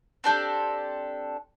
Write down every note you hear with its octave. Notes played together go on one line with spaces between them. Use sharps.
C4 D4 G4 A4